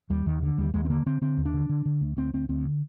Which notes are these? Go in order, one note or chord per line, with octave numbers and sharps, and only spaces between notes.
D#2 G3
D#2 D#3
D3
D#2 G3
D#2 G#3
C4
D3 A#3
D3 C4
D3 C4
D#2
D4
D3
D3
D3
D2
D2 C4
D2 C4
D2 C4
D3